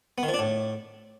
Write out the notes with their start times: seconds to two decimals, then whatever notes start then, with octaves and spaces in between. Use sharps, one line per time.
0.18 B3
0.23 D#3
0.28 F3
0.34 D4
0.39 A2